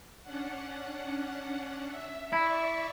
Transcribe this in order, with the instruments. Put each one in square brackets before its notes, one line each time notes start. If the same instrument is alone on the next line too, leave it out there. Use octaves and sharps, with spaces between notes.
[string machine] C#4 D4 F#5
E5
[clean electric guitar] E4 [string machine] D5 E5 C#6